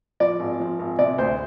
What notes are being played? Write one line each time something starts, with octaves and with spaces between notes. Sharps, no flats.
F3 D5
G#1
F3
G#1
C3 D5
D2 C5